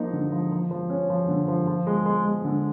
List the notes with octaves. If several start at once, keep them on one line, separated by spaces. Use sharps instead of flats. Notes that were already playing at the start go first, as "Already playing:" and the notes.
Already playing: F3 A#3 D#4
D3
F3
F3
F3
C#4
F3
D3
F3
F3
G#3
G#3
G#3
D3